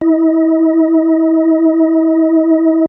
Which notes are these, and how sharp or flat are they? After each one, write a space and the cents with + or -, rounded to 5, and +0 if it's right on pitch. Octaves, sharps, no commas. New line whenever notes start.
E4 -30 D#5 +35